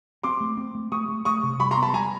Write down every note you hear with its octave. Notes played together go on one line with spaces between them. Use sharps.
C4 C6 D6
A3
C4
A3
A3 C#6 D#6
A3
A3 C#6 D#6
C3
G3 B5 C#6
A#5 C6
B3
A5 B5
G3 G#5 A#5